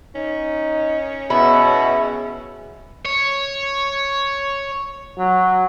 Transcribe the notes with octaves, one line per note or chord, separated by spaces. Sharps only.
C#4 D#4
B2 E4 G#4
C#5
F#3